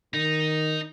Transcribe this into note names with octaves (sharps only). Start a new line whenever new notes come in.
D#3 D#4